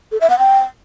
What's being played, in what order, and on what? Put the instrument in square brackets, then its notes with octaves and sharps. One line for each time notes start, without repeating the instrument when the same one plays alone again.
[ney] A4
E5
F#5
G5